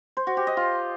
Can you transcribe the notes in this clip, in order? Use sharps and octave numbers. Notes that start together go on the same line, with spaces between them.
C5
F#4
G4
D#5
F4